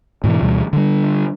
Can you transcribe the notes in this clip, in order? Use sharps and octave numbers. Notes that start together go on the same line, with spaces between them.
G#2 B2 D3 E3
D2 B2 E3 G3
D3 G3